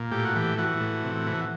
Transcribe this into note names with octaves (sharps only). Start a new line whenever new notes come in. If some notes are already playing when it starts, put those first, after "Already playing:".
Already playing: A#2
A2 G4
F#4
E3 G4
E3 F#4
A2
C3
E3